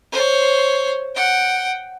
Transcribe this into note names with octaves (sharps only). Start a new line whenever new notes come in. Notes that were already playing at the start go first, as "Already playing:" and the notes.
C5 C#5
F#5 G5